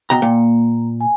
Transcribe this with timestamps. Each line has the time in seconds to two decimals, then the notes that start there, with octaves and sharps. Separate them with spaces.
0.10 B2 G5 A#5
0.22 A#2 A#3
1.01 G#5